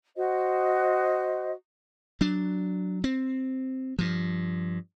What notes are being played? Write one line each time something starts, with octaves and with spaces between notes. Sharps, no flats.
F#4 C5 D#5
F#3 D4
C4
G2 F3